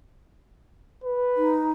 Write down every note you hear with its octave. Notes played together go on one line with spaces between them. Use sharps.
B4
D#4